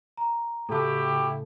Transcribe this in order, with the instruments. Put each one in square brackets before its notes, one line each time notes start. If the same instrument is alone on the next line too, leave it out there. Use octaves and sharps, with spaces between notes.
[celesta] A#5
[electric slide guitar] A2 C#3 [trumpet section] E4 F#4 G4 [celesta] A4 A5